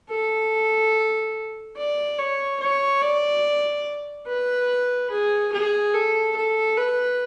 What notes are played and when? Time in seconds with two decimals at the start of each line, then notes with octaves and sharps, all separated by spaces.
0.10 A4
1.76 D5
2.18 C#5
2.60 C#5
3.02 D5
4.27 B4
5.10 G#4
5.52 G#4
5.94 A4
6.36 A4
6.77 B4